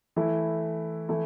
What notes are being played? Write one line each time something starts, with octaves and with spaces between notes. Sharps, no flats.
E3 A3 E4
E3 A3 E4